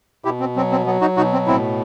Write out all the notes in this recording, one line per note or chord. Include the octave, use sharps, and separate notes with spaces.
B2 E4 G4
C4
F#3 C4
C4
F#3 B3
D#4 F#4
B2 D#4 F#4
C4
A2 C4 E4